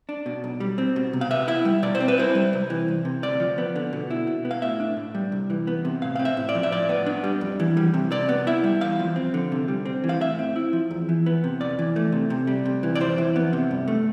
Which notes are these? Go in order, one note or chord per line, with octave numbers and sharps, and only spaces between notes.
D4
B2
B1
G3
C4
B2
C3
F5
B3 E5
E4 E5
G3
B2 D5
C5
C4
B4
E4 C5
G3
C2
E3
C2
C3
D2 D5
F3
B3
D3
B2
E4
B2
B3
F5
A2 E5
D4
A2
G3
C2
E3
B3
C3
A2 F5
C4 F5
E5
A2
D5
F3
E5
A2 D5
B3
D4
G3
F2
E3
G3
C3
C3 D5
B3
E4 E5
G3
E2 F5
F3
C4
D3
C3
G3
C4
E3
F5
A2 E5
C4
E4
F3
E2
E3
B3
C3
F2 D5
E3
A3
C3
C3
G3
C3
E3
D5
F2 C5
E3
B3
C3
G2
A3